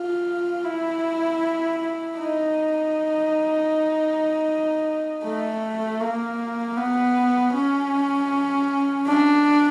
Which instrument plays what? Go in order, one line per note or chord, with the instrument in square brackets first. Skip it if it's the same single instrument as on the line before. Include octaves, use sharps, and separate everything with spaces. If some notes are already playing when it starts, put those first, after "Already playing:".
Already playing: [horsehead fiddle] F4
E4
D#4
A3
A#3
B3
C#4
D4